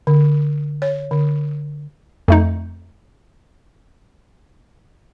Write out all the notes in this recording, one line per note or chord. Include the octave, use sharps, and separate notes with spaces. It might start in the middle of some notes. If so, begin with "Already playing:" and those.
D3
C#5
D3
F2 A3 D#4